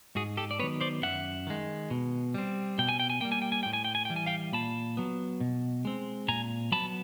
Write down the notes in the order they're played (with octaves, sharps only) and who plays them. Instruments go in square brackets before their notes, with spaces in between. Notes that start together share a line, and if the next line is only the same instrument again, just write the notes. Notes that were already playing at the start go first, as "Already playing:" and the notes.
[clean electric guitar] G#2 F#4 G#4
G4 A4
D5
D#3 F#3 B3 B4 C#5
C5 D5
F#2 E5 F#5
D#3 G#3
B2
G3 C4
B2 G5
G#5
G5
G#5
G3 A#3 G5
G#5
G5
G#5
A2 G5
G#5
G5
G#5
E3 G3 G5
G#5
F5 G5
A#2 A5 B5
F#3 B3
B2
G#3 C4
A#2 G#5 A#5
F#3 B3 A5 B5